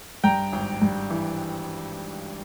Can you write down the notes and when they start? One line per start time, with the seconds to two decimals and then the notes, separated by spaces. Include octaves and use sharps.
0.24 G2 G5 A#5
0.53 G#1
0.82 G2
1.10 E3